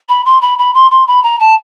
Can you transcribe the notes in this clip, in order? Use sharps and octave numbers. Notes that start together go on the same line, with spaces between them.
B5
C6
B5
B5
C6
C6
B5
A#5
A5